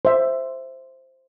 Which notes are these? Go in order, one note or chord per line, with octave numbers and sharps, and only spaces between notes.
C5 E5